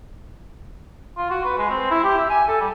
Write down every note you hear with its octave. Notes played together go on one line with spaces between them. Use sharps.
F4
F#4
B4
G#3
C4
E4
G4
E5
G#5
A4
G3